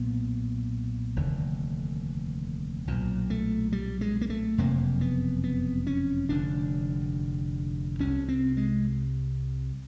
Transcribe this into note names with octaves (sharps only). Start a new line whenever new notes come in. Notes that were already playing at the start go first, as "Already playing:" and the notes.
Already playing: B1 A#2 B3
F1 D#2 D3
B1 A#2
A3
G3
G#3
A#3
A3
F#1 F2 C3 A#3
B3
B3
C#4
F1 D#2 D3 D4
C2 C3 C#4
C4
G#3